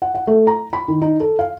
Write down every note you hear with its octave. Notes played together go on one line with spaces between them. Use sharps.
F#5
F#5
A3
A#5
B5
D#3
D#4
A4
F5